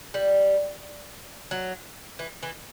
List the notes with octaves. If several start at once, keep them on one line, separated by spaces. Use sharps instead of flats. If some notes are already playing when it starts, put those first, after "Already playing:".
G3
F#3
E3
E3